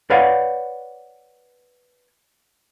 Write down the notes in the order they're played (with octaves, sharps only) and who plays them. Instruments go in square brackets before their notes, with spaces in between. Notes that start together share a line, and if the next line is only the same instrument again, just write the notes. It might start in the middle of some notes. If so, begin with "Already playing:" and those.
[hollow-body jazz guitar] B4 C#5 D5 F5 F#5